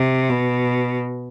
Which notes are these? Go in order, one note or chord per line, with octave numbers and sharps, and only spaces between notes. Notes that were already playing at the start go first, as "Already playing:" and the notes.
Already playing: C3
B2